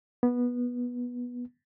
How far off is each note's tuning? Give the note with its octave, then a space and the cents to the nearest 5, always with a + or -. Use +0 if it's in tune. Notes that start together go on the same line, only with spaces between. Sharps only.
B3 -15